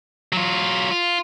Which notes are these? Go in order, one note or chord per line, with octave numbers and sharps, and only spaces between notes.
F#3 F4
F4